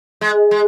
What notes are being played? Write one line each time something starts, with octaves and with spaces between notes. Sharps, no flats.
G#3
G#3